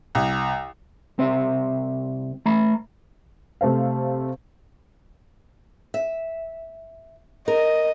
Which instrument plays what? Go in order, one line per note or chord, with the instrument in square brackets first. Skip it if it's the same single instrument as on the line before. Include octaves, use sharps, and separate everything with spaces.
[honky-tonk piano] C2
[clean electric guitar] C2 C4 C5 E5
A3 A#5 B5
[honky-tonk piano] C3 A3 C5 F5
[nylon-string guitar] E5
[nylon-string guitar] A#4 [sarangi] D#5